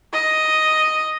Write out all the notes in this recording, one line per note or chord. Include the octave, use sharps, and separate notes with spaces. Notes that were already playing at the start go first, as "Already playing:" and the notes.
D#5